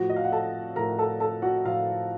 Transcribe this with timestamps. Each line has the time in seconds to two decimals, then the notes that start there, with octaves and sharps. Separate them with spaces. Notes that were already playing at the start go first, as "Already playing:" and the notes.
Already playing: A2 F3 F#4 F#5
0.10 D#5
0.16 F5
0.24 F#5
0.32 A4 A5
0.76 A2 F3 A#4 A#5
0.99 A4 A5
1.20 A4 A5
1.42 F#4 F#5
1.65 A2 F3 F4 F5